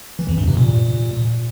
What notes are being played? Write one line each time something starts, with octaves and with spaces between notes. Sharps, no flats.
E3
F2
G2
C3
A#2